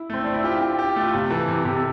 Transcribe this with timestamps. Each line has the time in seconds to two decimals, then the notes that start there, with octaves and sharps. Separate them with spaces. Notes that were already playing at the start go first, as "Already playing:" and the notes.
Already playing: E4
0.10 A3 C4
0.24 C4 D4
0.34 E4
0.43 F4 G4
0.61 G4
0.79 G4
0.96 A3
1.03 F4
1.14 C3 G4
1.30 E3 A4
1.48 C3
1.65 C3 G4
1.76 A4